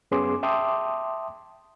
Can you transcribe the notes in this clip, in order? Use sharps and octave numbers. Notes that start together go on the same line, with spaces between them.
F#2 B3 C#4 G#4 C6 D6
E5 G5 A5 C6 D6 D#6